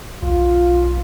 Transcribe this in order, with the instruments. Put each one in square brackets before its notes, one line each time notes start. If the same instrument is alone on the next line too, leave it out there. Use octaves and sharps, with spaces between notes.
[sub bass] B1 [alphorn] F4